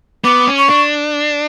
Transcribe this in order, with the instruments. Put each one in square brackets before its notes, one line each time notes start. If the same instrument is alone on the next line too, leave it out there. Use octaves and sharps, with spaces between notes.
[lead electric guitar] B3 [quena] D6
[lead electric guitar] C#4
[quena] C#6
[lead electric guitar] D4